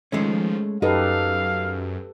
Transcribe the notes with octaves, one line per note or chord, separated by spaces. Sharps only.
D#3 F3 G#3 A3 C#4
F#2 D#4 G4 A4 B4 F5